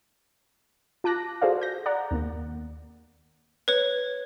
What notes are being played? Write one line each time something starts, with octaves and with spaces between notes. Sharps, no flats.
F4 A5 D6 F#6 A#6
F#4 G#4 A4 C5 D5 F5
G6 A#6
D5 F#5 A#5
D#2 A#3
B4 C#5